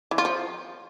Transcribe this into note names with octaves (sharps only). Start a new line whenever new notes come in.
E3
F4
F3